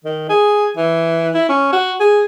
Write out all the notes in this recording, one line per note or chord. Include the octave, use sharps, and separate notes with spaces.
D#3
G#4
E3
E4
C#4
F#4
G#4